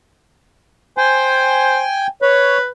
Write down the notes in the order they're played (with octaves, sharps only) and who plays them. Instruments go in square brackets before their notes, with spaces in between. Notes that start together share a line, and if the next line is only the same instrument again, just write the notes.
[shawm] C5 [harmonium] G5 G#5
[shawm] B4 [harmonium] C#5